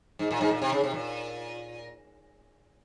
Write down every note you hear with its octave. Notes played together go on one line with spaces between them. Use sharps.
G#2
A#2
G#2
A#2
C3
C#3
C3
A#2